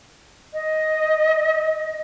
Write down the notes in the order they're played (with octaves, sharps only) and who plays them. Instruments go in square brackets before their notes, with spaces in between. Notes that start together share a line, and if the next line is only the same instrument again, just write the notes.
[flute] D#5